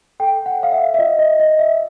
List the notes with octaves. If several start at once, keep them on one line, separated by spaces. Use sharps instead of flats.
A4 G5
F#5
C#5 F5
E5
E5
F4 D#5
D#5
F4 D#5
E5